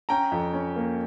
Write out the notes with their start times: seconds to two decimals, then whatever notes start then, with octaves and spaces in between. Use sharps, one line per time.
0.09 C#4 G5 A#5
0.32 F2
0.54 C#4
0.76 A#3